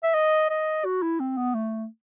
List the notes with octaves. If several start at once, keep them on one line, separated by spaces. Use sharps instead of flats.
E5
D#5
D#5
F#4
E4
C4
B3
A3